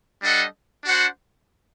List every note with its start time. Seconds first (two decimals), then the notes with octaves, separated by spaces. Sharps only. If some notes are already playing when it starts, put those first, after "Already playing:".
0.22 G3 D4 A4 D#5 F#5
0.84 D4 F#4 C5 F#5